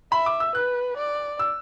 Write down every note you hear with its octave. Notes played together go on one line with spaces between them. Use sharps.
E5 B5
D6
E6
B4 F#6
D5
E6